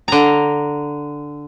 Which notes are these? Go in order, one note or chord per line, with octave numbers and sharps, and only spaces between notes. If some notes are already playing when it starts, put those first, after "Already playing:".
D3 A#5